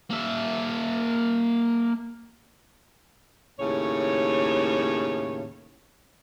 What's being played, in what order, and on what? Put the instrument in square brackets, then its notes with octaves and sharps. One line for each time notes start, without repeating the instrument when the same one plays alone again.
[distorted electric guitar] A#3 E5
[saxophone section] D#2 A2 C#3 C#5